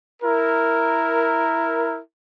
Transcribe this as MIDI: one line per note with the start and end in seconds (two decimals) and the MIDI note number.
0.23 1.99 64
0.23 1.99 70